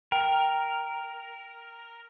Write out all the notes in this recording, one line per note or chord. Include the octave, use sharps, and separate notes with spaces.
A#4 G5